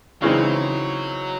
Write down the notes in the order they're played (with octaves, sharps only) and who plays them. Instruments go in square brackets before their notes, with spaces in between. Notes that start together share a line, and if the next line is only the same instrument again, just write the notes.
[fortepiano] C#3 E3 G#3 C4 D#4 [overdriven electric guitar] F#3